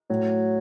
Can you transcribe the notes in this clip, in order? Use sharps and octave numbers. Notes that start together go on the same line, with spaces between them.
A2 F#3